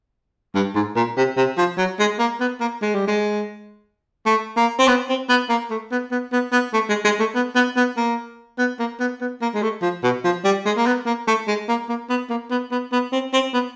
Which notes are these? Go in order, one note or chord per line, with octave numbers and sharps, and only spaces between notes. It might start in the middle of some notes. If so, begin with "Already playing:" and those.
G2
G#2
A#2
C3
C3
F3
F#3
G#3
A#3
B3
A#3
G#3
G3
G#3
A3
A#3
C4
B3
C4
B3
A#3
A3
B3
B3
B3
B3
A3
G#3
G#3
A3
B3
B3
B3
A#3
B3
A#3
B3
B3
A#3
G#3
A3
F3
B2
F3
G3
G#3
A#3
B3
A#3
A3
G#3
A#3
A#3
B3
A#3
B3
B3
B3
C4
C4
B3